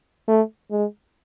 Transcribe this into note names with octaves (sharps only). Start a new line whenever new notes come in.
A3
G#3